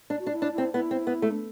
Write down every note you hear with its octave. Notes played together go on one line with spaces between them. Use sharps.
D4
F#4
D4
E4
D4
E4
C4
B3 E4
C4
B3
A3
D4